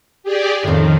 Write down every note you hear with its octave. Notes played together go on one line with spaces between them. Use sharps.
G4 G#4 D5
F2 A2 D#3